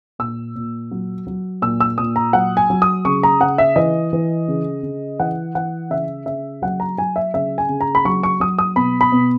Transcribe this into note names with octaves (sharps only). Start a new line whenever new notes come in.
A#2 E6
A#2
F#3
F#3
A#2 E6
E6
A#2 D#6
A#5
F#3 F#5
G#5
F#3
D#6
C#3 C#6
A#5
C#3 F#5
E5
E3 D#5
E3
C#3
C#3
E3 F#5
E3 F#5
C#3 E5
C#3 E5
F#3 F#5
A#5
F#3 G#5
E5
C#3 E5
G#5
C#3
A#5
B5
F#3 C#6
C#6
F#3 D#6
D#6
B2 B5
B5
B2